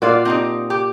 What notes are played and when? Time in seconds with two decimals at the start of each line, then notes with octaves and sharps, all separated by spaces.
0.02 A#2 F4 F#4 D5 F5
0.25 C4 D#4 G4
0.70 G4